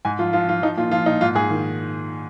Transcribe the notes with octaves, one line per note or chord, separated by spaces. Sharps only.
G#2 G#5
F3 F4
F3 F4
F3 F4
F3 D#4
A#2 F4
F3 F4
A#2 D#4
G#2 F4
G#2 G#4
D#3